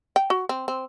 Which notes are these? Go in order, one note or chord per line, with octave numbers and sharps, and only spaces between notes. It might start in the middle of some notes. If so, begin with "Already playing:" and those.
G5
F#4
C4
C4